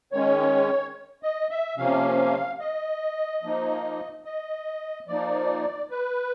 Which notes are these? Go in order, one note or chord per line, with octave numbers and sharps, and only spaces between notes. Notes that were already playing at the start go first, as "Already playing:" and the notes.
D#3 G#3 C#4 C#5
D#5
E5
C3 F3 A#3 C#4 F5
D#5
F3 A#3 D#4
D#5
F3 A#3 D#4 D5
B4